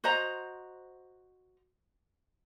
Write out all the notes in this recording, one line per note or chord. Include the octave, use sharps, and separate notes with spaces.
F#4 C5 D#5 A#5